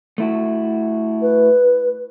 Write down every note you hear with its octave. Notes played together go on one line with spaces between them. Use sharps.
A3 E4 F#4
B4